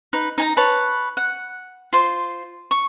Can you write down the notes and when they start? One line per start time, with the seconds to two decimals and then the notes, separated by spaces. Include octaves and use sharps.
0.13 D#4 B4
0.38 D#4 G#5 A#5
0.57 B4 C#5 A5
1.17 F#5
1.93 F4 C5
2.71 C#6